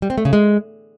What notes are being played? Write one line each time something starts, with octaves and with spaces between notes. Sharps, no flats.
G3
C4
A3
C#3
G#3